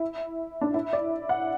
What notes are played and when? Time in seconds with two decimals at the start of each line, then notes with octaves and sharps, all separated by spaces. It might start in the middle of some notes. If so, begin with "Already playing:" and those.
Already playing: E4
0.61 D4
0.74 E4
0.93 D5
1.29 F#5